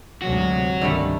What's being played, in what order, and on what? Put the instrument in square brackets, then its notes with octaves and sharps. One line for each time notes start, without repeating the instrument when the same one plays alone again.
[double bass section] D2 G#2 C3 [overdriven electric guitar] F#3 F#4
[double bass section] G1 C2 D#3 [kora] D3 G3 A3